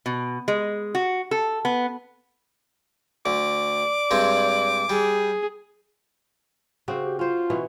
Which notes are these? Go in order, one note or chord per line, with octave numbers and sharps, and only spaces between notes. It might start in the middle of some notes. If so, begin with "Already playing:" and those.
B2
G#3
F#4
A4
B3
D2 D5 D6
G2 G#3 C4
G3 G#4
C#3 C4 F#4
G4
C#4 F4 C5
B2 E3 C#4